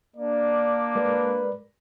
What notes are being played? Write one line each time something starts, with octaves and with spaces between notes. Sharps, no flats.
A#3 D4 D5
G#3 A#4 B4 D5